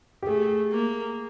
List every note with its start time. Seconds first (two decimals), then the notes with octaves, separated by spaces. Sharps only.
0.22 G4
0.27 A3 G#4
0.73 A#3